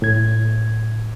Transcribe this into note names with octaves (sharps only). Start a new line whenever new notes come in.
A2 G#6